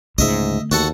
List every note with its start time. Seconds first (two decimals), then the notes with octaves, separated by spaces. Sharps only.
0.18 C#2 G#2 D3 A3 D#5 E5
0.71 D#2 F#4 A4 F#5